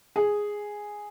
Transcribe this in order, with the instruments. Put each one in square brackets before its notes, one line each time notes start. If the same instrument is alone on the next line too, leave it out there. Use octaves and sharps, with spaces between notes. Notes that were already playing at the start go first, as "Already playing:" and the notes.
[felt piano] G#4